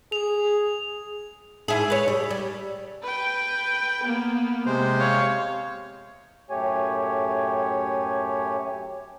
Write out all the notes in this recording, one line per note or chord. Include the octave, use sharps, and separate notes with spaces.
G#4 F7
G#2 E4 G#4
B4 C#5
G3
G3
B4 G5
A#3 B3
C3 G#3 C5
C#5 F5
F#2 A2 A3 G4 C#5 G#5